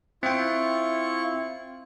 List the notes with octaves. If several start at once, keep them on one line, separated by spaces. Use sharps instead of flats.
C4 E4 F4 G5 C#6